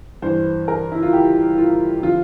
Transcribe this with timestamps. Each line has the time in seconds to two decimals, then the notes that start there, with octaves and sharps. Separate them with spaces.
0.22 G2 E3 C5
0.68 A#4
0.92 E4
1.03 F4
1.13 G4
1.58 F4
2.03 D3 F3 F4